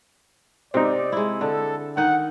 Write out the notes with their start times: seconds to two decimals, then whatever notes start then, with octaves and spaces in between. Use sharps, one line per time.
0.74 C3 C4 D#4 D5
1.12 G#3 E4
1.41 D3 A4
1.97 D#3 D#4 F#5